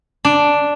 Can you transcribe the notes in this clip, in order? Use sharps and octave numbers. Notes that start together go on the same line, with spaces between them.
D4